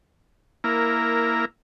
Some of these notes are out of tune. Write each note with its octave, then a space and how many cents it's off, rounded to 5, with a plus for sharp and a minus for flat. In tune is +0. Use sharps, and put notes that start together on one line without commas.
A#3 +0 E4 +0 A#4 -10